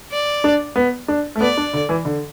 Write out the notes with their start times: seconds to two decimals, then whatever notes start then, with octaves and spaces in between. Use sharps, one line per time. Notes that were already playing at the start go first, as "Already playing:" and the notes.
0.12 D5
0.44 D4
0.76 B3
1.08 D4
1.36 A3
1.41 B3 D5
1.57 D4
1.73 D3
1.89 E3
2.05 D3